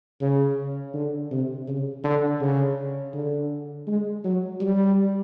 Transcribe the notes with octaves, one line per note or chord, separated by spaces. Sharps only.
C#3
D3
C3
C#3
D3
C#3
D3
G#3
F#3
G3